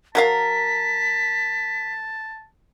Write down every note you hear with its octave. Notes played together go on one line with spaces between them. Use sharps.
F#3 A#4 F5 A5 B6